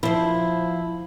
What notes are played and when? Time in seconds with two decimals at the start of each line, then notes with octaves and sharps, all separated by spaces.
0.03 F3 E4 C5